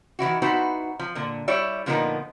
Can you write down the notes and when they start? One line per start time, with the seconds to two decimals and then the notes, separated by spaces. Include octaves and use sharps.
0.19 D#3 E3 E4 F#4
0.42 B3 D#4 E4 F#4 B4 C5
0.99 F3
1.15 A#2 D3
1.48 G3 E4 C#5 D5 E5
1.86 A#2 D3 F3 B3 D#4 A#4